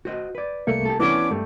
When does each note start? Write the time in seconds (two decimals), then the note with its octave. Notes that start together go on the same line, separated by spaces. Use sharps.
0.05 F#4 C5 D#5
0.35 B4 D5
0.67 C2 A3 A#3 C#7
0.85 G4 A4
1.00 E3 B3 C#4 D4 F#4 D6
1.31 G2 G3 A3